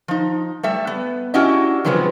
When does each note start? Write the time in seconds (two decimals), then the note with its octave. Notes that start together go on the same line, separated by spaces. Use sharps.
0.08 F3 D#4
0.63 G3 A3 E5
0.87 B3
1.34 C#4 D4 E4 F#4 G4 D#5
1.85 C3 F3 F#3 G#3 A3 B3